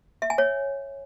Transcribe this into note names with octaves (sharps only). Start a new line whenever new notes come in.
E5
G#5
C#5